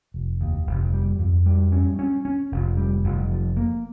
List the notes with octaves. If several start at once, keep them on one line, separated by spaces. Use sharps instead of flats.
F1
D#2
F1
G3
F2
G3
C#4
C#4
C#4
F1
G3
F1
F3
A#3